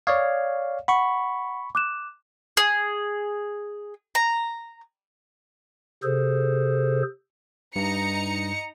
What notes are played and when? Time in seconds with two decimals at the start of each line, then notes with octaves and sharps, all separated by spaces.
0.07 C#5 D5 F5 C#6 D#6 G#6
0.88 F#5 B5 C#6
1.75 D6 F#6 E7
2.57 G#4
4.15 A#5
6.03 C3 G#4 A4 C5
7.76 G2 D#4 A#5 C#7